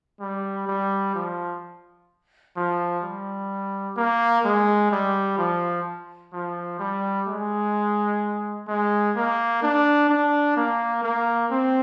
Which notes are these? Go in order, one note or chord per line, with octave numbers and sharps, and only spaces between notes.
G3
G3
F3
F3
G3
A#3
G#3
G3
F3
F3
G3
G#3
G#3
A#3
D4
D4
A#3
A#3
C4